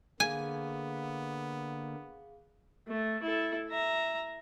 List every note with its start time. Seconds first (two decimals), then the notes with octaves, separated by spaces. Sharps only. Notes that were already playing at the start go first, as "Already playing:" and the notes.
0.20 D3 A#3 B3 G#4 F5 G#5
2.87 A3
3.22 E4 A4
3.69 E5 A#5